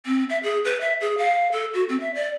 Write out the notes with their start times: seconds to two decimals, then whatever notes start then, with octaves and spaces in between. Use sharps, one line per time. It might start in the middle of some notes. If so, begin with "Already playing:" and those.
0.06 C4
0.30 E5
0.43 G#4
0.65 B4
0.81 E5
1.01 G#4
1.18 F5
1.52 A4
1.74 F#4
1.89 C4
2.00 E5
2.15 D5